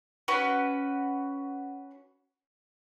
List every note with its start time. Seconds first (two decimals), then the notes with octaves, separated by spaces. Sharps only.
0.28 C#4 F#4 B4